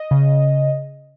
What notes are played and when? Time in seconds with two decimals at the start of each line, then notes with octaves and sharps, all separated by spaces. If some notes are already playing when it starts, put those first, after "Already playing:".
Already playing: D#5
0.11 C#3